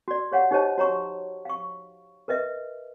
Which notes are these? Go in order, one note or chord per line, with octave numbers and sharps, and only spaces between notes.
F#4 D5
G4 C#5 F5 F#5
D#4 G4 C5 C#5 D#5 A5
F#4 C#5 A#5 C#6
F5 C#6
A#4 B4 D#5 E5